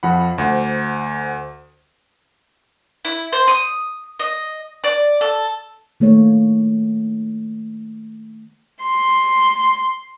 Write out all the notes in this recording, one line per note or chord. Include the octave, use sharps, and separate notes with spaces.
F2 F3 F#5 B5
D2 C5 F#5
E4
C5
D#6
D#5
D5
A4
D#3 A3 A#3 C#5
C6